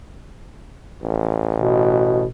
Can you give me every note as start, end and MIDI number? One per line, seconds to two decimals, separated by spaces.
1.03 2.26 33
1.59 2.27 47